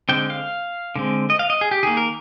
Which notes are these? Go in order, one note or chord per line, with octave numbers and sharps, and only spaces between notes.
D3 G#3 C4 G5
F5
D3 G#3 C4
D#5
F5
D#5
G#4
G4
D#3 A#3 G#4
A#4